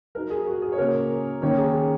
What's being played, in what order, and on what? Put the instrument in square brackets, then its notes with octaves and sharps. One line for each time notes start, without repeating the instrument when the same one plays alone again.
[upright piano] F#3 D#4 [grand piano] A#4
[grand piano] G#4
F#4
G#4
C#5
[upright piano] C#3 A#3 C#4 [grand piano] A#4
[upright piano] D#3 A#3 C#4 [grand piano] C#5
[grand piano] G#4
G#4